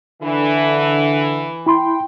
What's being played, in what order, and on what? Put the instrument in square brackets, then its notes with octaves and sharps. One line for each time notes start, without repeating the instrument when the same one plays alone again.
[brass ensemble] D3 [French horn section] E3
[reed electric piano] E4 B5 C6 [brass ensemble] G5